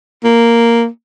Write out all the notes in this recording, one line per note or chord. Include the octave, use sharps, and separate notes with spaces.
A#3